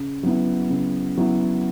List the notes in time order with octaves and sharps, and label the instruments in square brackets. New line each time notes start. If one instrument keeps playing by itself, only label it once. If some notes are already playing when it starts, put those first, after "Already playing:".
Already playing: [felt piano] C#3
F#3 B3 E4
C#3
F#3 B3 E4